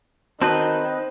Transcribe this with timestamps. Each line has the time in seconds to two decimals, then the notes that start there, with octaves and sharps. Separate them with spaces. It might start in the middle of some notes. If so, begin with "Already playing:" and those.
0.41 D#3 C4 D#4 F#4 B4 C5 A5 B5